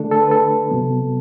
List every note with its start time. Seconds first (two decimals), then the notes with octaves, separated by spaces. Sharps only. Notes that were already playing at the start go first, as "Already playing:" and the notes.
Already playing: D3 A3 D4 A4
0.11 A4
0.21 B4
0.32 A4
0.70 C3 F#3 B3